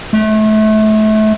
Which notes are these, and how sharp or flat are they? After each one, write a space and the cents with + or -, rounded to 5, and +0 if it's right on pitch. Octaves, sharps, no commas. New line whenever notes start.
A3 -30